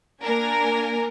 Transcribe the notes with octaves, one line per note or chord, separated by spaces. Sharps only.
A#3 D4 A#4 G#5